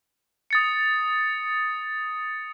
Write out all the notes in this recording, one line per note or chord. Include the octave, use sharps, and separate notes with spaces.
D#6 A6 C#7